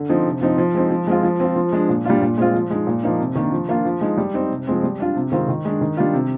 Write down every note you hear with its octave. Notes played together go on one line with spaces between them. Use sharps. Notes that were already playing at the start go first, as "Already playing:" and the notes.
Already playing: D3
F3 C4 D#4
C3
F3 C4 D#4
F3
G#3 C4 D#4
F3
G#3 C4 F4
F3
C4 F4
F3
G#3 D4
A#2
G3 D4 F4
A#2
G#3 C4 F4
F3
G#3 D#4
A#2
F3 A#3 D#4
C3
D#3 A#3 D4
F3
A#3 D4 F4
F3
G#3 D#4
G3
C4 D#4
C3
F3 G#3 C4
G3
D4 F4
C3
D#3 G#3 C4 F4
D#3
G#3 D4
D#3
G3 D4 F4
C3